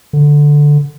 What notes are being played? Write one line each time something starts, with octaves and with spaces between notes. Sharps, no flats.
D3